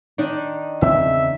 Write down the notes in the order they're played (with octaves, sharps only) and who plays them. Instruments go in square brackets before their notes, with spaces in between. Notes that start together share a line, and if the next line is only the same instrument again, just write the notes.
[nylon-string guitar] D#3 D4 D#4
[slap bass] E2 C#3 C4 [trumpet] E5